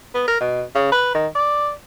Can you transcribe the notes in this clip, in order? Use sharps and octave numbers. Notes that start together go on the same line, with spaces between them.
B3
A#4
B2
C#3
B4
D#3
D5